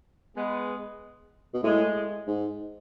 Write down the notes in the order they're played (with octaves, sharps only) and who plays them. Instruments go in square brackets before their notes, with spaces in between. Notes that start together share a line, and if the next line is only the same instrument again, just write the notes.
[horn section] G#3 B3
[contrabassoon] B2
[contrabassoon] A2 [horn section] G#3
[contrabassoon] G#2